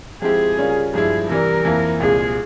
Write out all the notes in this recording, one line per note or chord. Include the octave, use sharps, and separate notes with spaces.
F3 G#3 C4 E4 G4 G#4
C#3 G3 C#4 F4 A#4
G2 F3 G#3 E4 G#4
C3 E3 G3 A#4
F2 E3 A#3 E4
C2 A#2 G#3 C4 F4 G#4